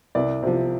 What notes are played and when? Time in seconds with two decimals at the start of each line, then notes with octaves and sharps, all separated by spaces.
0.15 C2 D5
0.43 C3 F3